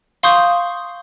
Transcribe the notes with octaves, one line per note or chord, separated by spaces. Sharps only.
F5 C6 C#6 D#6 G6 C7